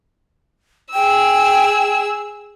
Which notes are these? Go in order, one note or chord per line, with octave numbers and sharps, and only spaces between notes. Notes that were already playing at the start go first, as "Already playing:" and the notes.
G#4 G5 E6